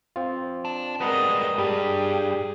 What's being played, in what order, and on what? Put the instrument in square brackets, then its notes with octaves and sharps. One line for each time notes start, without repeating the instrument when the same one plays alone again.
[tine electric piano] C4 F4
[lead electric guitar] D4
[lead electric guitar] G3 G#3 [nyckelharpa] A#4 D#5 [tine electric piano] B4 F#5 A#5
[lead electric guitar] G2 [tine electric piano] G3 [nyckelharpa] G4 G#4